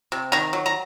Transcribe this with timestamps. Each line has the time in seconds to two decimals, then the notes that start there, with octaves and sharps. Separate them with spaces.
0.12 C3
0.32 D#3 A#5
0.53 F#3
0.66 A#5